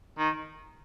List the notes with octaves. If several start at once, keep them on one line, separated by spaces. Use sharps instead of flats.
D#3